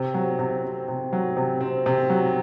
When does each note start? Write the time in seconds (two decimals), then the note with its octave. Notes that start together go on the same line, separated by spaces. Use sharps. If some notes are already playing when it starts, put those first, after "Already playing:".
Already playing: C3
0.14 F#3
0.39 C3
0.63 C4
0.88 C3
1.13 F#3
1.37 C3
1.61 C4
1.86 C3
2.10 F#3